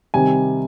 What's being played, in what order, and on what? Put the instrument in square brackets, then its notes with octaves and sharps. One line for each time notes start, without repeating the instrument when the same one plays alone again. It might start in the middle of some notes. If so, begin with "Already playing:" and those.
[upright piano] C3 D#3 G3 C4 G#5